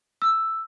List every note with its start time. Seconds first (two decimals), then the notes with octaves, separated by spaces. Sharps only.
0.22 E6